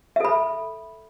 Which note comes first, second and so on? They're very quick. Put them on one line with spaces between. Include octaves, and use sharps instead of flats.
E5 A4 B5